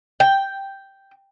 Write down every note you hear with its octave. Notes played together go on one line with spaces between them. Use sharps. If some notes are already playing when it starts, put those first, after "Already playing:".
G5